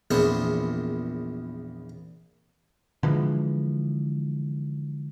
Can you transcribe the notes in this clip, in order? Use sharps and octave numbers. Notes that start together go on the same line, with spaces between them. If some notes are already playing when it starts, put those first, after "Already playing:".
A#1 E2 A#2 B3 C4 G#4
D3 E3 F3 G#3